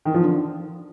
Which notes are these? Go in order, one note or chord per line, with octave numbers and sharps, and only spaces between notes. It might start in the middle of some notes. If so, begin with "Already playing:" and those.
D#3
F3
D3